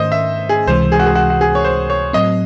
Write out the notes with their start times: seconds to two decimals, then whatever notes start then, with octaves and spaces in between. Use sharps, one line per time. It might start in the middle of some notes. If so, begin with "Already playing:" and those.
Already playing: G#2 D#3 A3 C#4 C5 D#5
0.12 E5
0.49 G#4
0.67 C#2 C3 E3 G#3 C5
0.92 G#4
0.99 F#4
1.06 G#4
1.15 F#4
1.30 F#4
1.41 G#4
1.55 C#5
1.65 C5
1.90 C#5
2.13 A2 F#3 C4 D#5